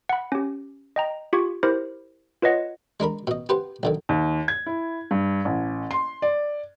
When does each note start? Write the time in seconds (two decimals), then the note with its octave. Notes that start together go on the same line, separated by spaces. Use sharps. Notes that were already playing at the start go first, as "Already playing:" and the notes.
0.09 F#5 B5
0.32 C#4 G4
0.96 D#5 G5 A#5
1.33 F4 G4 C#6 G#6
1.63 E4 G4 A#4 C5
2.42 F4 B4 C#5 D#5 F#5
3.00 G#3 D4 A#4 B5
3.27 B2 D#5
3.49 G4 B4 C5 F#5
3.83 B1 D3 D#3
4.09 D#2
4.48 G#6
4.66 E4
5.11 G2
5.45 A1
5.91 C6
6.22 D5